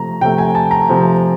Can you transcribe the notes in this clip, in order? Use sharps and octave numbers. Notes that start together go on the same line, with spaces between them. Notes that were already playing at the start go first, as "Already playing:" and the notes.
Already playing: C3 F3 A3 A#5
C3 F3 A3 G5
G#5
A5
A#5
C3 F3 A3